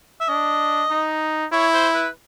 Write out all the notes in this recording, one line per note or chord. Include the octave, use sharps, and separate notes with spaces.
E5
D4 D#5
D#4
E4 C#5
C5
B4